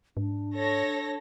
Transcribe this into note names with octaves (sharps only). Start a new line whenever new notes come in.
G#2 D4
A4 C#5 A#6